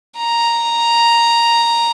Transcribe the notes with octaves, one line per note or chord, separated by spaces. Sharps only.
A#5